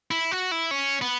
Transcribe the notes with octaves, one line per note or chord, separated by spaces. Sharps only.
E4
F#4
E4
C#4
B3